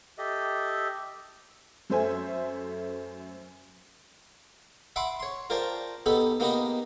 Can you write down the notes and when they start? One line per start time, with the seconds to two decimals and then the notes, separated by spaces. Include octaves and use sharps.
0.18 G4 A4 D#5 E5
1.90 F#2 A3 C5 E5 G#5
4.96 E5 F#5 B5 C6 D6
5.20 C#5 C6
5.50 F4 A#4 C5 D5 G5 A5
6.06 B3 D#4 G4 A4 B4
6.40 A#3 B3 D#4 G4 B4 D#5